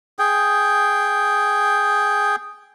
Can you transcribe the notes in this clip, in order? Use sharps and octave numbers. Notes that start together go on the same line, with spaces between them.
G#4 G5